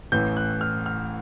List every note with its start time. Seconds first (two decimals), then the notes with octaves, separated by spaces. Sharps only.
0.12 A1 A2 E3 G6
0.37 F#6
0.61 F6
0.86 F6